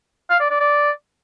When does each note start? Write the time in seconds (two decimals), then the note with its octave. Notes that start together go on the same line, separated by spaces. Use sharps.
0.30 F5
0.40 D5
0.50 D5
0.60 D5